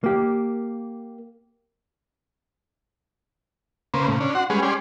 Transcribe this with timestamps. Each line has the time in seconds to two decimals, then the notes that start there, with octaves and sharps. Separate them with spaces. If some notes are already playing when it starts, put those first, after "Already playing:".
0.04 A#3 G4
3.94 C#3 A#3 B4 C5
4.08 A2 C#3
4.20 C#4 D4
4.35 F#4 F#5 C6
4.50 G3 G#3 C#4 G#4 B4
4.63 C#4 G4 D5 G#5 C6